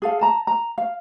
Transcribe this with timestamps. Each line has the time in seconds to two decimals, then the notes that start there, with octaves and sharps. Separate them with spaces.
0.02 G#4 A4 F5
0.21 A5 A#5
0.47 A#5
0.78 F5